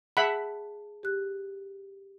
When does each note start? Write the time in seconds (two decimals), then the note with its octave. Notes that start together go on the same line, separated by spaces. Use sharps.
0.17 G#4 E5 F#5 A5 B5
1.03 G4 F#6